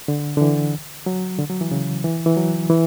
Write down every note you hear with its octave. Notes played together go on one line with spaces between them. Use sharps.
D3
D3
E3
F#3
D3
F#3
E3
C#3
E3
E3
F#3
E3